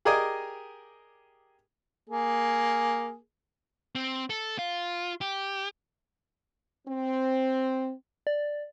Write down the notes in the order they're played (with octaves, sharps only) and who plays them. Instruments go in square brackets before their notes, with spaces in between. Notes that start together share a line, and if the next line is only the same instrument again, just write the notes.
[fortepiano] G4 G#4 A#4 D5 D#5 G#5
[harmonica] A#3 G#4
[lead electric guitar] C4
A4
F4
G4
[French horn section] C4
[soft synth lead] D5